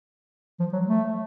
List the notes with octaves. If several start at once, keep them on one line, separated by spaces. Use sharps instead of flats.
F3
F#3
A3